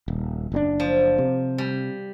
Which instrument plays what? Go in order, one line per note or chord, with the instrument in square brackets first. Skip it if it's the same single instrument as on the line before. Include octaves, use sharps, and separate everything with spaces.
[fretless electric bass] D#1
F#1 A#2 D4
[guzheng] F3
[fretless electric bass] C3
[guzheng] G3